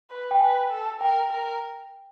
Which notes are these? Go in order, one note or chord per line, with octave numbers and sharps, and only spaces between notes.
B4
G5
B4 G#5
A4
A#4 G5
A#4